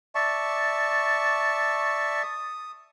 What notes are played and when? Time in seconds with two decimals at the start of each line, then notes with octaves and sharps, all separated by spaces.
0.15 D5 E5 A5 C#6
2.23 D#6